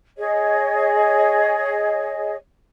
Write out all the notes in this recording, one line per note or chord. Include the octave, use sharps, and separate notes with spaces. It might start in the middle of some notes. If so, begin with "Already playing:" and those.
G#4 C#5 D#5